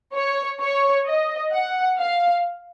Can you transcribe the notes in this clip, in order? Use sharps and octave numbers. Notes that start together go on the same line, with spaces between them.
C#5
C#5
D#5
F#5
F5